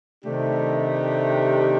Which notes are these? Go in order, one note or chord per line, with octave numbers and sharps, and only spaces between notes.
C3 D#3 A3 D4 G4